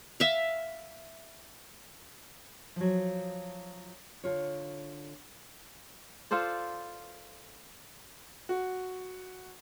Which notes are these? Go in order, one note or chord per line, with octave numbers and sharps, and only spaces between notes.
E5 F5
F3 F#3
D3 F4 C#5
F4 A4 C5 D5
F#4